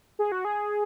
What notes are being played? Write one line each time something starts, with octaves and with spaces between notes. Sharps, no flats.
G#4
F#4
G#4